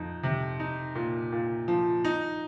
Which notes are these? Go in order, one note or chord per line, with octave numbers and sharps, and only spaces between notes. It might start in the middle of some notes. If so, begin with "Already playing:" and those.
Already playing: F2 D#4
C3
D#4
A#2
A#2
F3
D#4